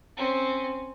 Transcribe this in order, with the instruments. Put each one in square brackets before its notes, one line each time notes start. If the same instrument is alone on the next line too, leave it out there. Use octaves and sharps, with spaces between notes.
[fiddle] C4 C#4